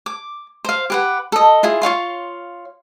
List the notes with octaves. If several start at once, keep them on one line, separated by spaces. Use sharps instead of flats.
D6
C5 F5
G4 B4 F#5
A4 D#5
E4 F4 G#4
F4 C#5 F5 C6